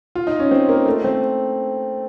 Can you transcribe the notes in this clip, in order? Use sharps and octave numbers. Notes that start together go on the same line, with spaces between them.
F4
D#4
C#4
C4
A#3
A3
C4